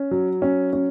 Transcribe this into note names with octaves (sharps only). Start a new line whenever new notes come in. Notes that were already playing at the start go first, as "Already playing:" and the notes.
Already playing: C#4
F#3
C#4
C#4